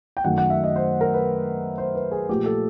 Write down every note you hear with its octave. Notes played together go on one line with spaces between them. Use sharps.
G5
F#2 D#3 F#3 A3 F#5
F#5
E5
D#5
C5
A#4
B4
C5
B4
G#4
A#2 F3 A3 G4
A4